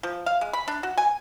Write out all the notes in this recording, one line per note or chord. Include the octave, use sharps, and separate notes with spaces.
F3
F5
G#3
B5
D4
F#4
G#5